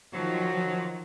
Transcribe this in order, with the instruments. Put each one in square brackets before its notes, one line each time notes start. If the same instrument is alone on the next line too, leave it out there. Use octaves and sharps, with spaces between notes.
[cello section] D#3 F3 [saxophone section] F#3